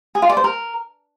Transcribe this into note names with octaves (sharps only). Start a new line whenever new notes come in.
G#4
F4
D5
C5
A#4